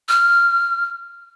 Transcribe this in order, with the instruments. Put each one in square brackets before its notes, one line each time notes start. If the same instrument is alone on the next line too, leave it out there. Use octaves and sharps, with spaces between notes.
[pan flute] F6